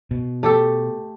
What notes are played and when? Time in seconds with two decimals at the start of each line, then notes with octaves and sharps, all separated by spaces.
0.11 B2
0.43 A3 G4 A4